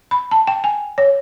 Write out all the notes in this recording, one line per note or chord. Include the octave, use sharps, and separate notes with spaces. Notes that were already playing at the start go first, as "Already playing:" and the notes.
B5
A5
G5
G#5
C#5